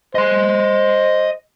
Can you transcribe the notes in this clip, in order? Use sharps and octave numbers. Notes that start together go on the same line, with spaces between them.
C5 D#5 C6